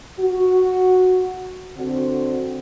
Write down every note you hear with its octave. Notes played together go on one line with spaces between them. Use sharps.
F#4
D3 C4 F#4